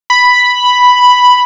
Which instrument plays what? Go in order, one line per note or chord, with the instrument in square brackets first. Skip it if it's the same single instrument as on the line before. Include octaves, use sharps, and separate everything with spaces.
[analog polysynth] B5